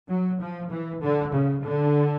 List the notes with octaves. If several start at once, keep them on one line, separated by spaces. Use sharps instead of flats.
F#3
F3
E3
D3
C#3
D3